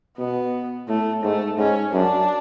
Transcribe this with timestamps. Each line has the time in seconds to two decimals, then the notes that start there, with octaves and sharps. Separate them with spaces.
0.18 B2 B3
0.88 A2 A3
1.23 G#2 A3
1.57 G#2 C#4
1.93 F#2 D4